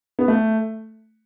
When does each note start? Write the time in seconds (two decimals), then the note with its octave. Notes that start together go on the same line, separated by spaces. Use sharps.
0.19 B3
0.28 A3